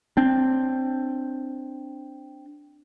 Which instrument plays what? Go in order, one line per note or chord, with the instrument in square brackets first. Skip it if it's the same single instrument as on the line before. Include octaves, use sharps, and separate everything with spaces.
[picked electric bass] C4 D4